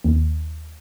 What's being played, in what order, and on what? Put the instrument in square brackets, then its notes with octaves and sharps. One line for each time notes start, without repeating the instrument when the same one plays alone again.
[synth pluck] D#2